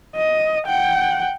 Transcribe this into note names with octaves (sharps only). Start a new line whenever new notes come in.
D#5
F#5 G5